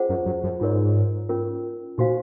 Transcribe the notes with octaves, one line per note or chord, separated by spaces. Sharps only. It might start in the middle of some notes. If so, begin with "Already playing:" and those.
Already playing: C#4 F4 G#4 C5 F#5
F#2
F#2
F#2
G#2 F4 A#4 C#5
C#4 F4 A#4
A#2 D#4 F#4 C5 F5 G#5